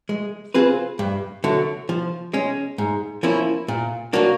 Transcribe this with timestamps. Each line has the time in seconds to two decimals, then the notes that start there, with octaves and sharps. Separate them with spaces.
0.09 G#3
0.54 C4 F4 G#4 B4
0.99 G2
1.44 D3 F#3 A3
1.89 F3
2.34 G#3 C#4
2.78 G#2
3.23 F3 A#3 C#4 E4
3.68 A#2
4.13 F#3 A#3 D4 F#4